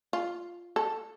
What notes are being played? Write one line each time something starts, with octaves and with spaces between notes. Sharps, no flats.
F4
A4